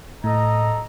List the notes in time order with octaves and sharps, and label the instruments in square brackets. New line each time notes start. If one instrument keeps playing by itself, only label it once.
[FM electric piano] A2 [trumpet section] A4 D#5 A#5